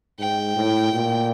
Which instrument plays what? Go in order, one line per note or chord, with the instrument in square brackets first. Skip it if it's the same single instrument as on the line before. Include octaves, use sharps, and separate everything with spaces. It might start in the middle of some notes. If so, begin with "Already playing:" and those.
[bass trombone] G#2 [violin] G5
[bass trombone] A2
A#2